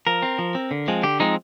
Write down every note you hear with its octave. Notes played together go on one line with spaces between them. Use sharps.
F3 A#4
C4
F3
C4
D3
F3 G#3 C4
D3 G4
F3 G#3 C4 D#4